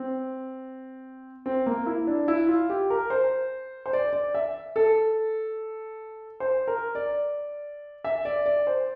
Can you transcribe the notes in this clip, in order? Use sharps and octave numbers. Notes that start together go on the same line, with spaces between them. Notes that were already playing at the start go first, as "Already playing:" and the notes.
Already playing: C4
C4
A#3
E4
D4
E4
F4
G4
A#4
C5
C5
D5
D5
E5
A4
C5
A#4
D5
E5
D5
D5
C5